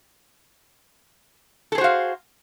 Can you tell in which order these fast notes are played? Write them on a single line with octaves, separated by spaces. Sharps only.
A4 G#4 C5 F#4 F5